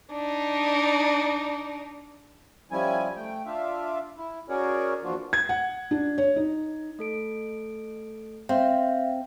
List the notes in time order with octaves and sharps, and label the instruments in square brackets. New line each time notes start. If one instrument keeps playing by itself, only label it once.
[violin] D4 D#4
[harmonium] F3 G3 C#4 E4 G#5
A3 G5
D4 F4 E5 F5
E4
C#4 F#4 G#4 A#4 C#5 D5
E2 F3 A#3 D4 F4 F#4
[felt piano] G#6
F#5
D4
C#5
D#4
[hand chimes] A3 A4 D7
[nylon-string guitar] C4 [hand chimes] E5 F5